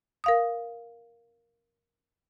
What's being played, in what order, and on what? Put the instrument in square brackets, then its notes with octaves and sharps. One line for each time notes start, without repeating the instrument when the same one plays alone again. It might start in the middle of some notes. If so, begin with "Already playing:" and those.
[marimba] A#4 F5 D#6